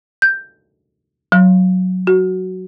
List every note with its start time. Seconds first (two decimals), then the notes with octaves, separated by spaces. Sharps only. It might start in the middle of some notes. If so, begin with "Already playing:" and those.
0.22 G6
1.32 F#3
2.07 F#4